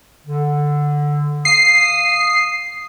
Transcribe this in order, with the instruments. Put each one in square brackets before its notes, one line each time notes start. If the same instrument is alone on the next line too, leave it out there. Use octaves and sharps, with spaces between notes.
[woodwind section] D3
[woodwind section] F5 D#6 [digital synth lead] C7